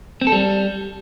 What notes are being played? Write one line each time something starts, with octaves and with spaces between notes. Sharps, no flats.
C4
A4
G3